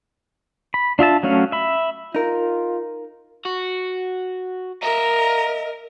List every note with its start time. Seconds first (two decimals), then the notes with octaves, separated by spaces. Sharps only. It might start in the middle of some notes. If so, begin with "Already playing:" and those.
0.74 B5
0.99 D4 F4 E5 A5
1.23 F#3 A3 C#4 F5 F#5
1.52 E5 B5
2.15 D#4 F4 A#4
3.45 F#4
4.83 A#4 D#5 E5 A#5